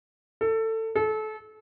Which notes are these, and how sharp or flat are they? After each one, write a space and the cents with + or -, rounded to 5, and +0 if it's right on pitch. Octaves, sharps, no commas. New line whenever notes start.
A4 +20
A4 -30